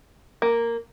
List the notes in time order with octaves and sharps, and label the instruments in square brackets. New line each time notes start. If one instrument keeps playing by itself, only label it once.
[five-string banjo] A#3